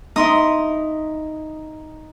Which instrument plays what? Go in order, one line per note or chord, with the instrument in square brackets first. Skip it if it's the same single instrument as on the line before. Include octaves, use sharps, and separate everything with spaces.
[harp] D#4 [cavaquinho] E4 C6 D#6